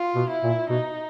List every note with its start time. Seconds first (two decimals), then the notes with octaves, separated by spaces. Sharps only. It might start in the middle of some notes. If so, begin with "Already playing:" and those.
Already playing: F4
0.15 B2
0.30 E4
0.43 A#2
0.70 B2 D#4